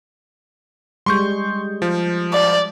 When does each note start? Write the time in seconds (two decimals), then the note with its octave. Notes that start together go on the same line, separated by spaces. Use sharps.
1.06 G3 G#3 C6 C#6 G6
1.82 F3
2.33 D5